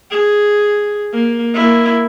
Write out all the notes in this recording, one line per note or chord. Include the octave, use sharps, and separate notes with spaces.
G#4
A#3
A#3 E4